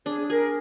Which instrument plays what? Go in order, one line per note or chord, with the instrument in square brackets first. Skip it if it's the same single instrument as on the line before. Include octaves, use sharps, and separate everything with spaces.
[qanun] D4 [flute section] G#4
[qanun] G#4 [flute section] A#4